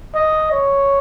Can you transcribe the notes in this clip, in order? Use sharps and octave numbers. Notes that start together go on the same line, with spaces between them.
D#5
C#5